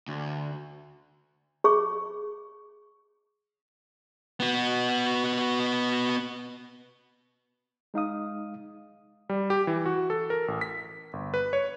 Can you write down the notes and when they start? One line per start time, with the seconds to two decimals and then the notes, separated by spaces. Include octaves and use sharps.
0.08 D2
1.64 G#4 C#6
4.40 B3 F#4
7.94 G#3 D#4 F5 D#6
9.29 G3
9.50 G4
9.67 E3
9.85 F#4
10.10 A4
10.30 A#4
10.48 A1
10.61 B6
11.13 G1
11.34 B4
11.53 C#5